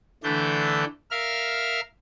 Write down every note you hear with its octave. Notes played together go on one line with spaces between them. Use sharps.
D3 E3 A3 D4 G6
A#4 E5 F5 F6